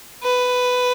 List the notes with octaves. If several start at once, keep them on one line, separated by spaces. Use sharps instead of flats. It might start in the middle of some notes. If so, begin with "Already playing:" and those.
B4